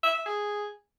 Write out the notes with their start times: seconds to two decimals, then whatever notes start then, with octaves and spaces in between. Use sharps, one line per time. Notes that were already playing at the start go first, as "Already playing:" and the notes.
0.03 E5
0.14 E5
0.26 G#4